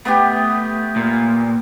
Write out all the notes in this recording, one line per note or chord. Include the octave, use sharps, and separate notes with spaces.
A3 B3 G4
A#2